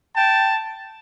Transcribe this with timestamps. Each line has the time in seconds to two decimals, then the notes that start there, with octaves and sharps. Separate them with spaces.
0.14 G5 A5